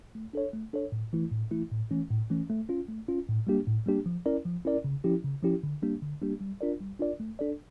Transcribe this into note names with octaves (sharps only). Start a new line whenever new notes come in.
A3
D4 A4 C#5
A3
D4 A4 C#5
A2
E3 A3 E4
A2
E3 A3 E4
A2
E3 A3 C#4
A2
E3 A3 C#4
A3
C#4 F4
A3
C#4 F4
A2
G3 A#3 D4 G4
A2
G3 A#3 D4 G4
F3
C#4 E4 A#4 D5
F3
C#4 E4 A#4 D5
C#3
F3 C#4 E4 G4
C#3
F3 C#4 E4 G4
D3
G3 A#3 D4 G4
D3
G3 A#3 D4 G4
G3
D4 F4 A#4 D5
G3
D4 F4 A#4 D5
A3
D4 A4 D5